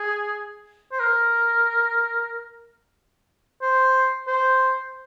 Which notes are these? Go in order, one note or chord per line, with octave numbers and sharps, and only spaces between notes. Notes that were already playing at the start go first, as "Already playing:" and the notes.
Already playing: G#4
C5
A#4
C5
C5